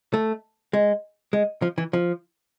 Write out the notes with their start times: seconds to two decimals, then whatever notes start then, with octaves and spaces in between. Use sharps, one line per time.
0.14 A3
0.73 G#3
1.33 G#3
1.62 F3
1.78 E3
1.93 F3